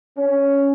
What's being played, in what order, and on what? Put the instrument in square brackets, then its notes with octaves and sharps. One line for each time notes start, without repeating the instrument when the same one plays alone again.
[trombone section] C#4